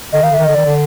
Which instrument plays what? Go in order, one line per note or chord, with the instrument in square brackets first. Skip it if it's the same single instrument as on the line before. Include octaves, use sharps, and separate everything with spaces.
[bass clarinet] D3 [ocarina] D#5
[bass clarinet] D#3 [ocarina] F5
[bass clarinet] D3 [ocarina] E5
[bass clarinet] D#3
[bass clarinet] D3 [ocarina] D#5
[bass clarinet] D#3 [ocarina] D5
[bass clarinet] D3